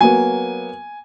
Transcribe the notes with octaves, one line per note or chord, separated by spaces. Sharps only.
F#3 A#3 B3 G#5